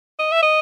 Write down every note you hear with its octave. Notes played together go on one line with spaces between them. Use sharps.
D#5
E5
D#5